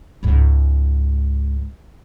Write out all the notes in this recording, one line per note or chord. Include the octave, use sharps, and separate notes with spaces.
C#2 G#2